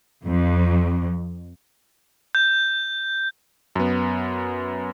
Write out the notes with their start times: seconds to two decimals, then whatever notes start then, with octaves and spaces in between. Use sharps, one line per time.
0.25 F2
2.35 G6
3.76 F#2 B3